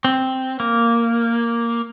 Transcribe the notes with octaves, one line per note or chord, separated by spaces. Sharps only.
C4
A#3